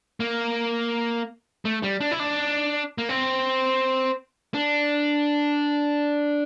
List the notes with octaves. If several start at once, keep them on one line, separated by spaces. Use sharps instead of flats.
A#3
A3
G3
D4
E4
D4
A#3
C4
D4